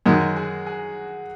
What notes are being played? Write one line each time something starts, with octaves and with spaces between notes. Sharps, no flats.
F#2 D#3 G#3 F#4
G#4
G#4